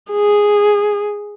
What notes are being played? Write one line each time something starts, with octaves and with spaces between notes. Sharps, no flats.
G#4